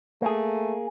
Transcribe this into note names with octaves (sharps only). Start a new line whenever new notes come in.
A3 A#3 G#4